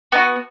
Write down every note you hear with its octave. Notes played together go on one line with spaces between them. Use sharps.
B3 D#4
F#4